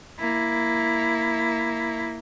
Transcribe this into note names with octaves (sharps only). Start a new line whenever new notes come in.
A#3 E4